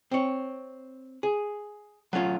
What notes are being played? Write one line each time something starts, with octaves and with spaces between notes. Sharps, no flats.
C4 C#5
G#4
F#3 A3 C#4 F4